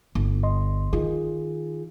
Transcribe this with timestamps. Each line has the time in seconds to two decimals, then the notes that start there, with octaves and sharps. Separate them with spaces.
0.15 G1
0.43 D#5 C6
0.93 D#3 F4 G#4